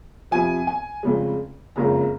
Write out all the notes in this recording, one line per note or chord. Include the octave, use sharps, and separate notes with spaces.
F2 C3 F3 G#5
G#5
F1 F2 C#3 G#3
F#1 F2 C#3 G#3 A#5